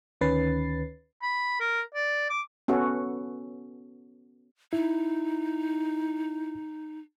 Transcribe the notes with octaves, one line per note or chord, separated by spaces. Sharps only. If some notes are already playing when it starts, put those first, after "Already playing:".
D2 D#3 C#4 B4 A6 C7
B5
A#4
D5
D6
B3 C#4 F#4 A4
D#4 E4